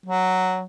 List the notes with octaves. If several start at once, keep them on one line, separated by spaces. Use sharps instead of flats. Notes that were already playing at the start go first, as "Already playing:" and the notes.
F#3